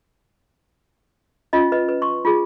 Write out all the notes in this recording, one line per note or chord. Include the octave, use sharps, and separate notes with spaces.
C#4 F4 D#5
B4 D#5
B4
C6 C#6
F4 G#4